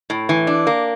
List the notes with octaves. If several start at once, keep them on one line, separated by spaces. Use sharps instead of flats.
A2
E3
D4
A#3